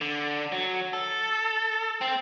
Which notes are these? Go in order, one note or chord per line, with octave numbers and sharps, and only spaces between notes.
D3
F#3
A4
C4